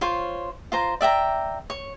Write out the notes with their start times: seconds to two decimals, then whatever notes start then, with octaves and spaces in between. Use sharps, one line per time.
0.01 F4 C5 C#5
0.72 F4 C5 A#5
1.01 D5 E5 G5 A#5
1.70 C#5